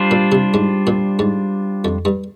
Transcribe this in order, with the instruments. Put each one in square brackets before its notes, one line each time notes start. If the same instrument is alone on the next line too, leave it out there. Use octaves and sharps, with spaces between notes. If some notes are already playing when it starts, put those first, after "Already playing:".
Already playing: [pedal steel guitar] G3 D4 F4 C5
[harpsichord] A#2
C3
G#2
A#2
G#2
F2
G2